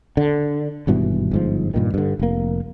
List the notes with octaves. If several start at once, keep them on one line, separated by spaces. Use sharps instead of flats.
D3
G#1 G2 B2 E3
G1 G#2 F3
G2 A#2 D#3
G2 D3
F1 A#3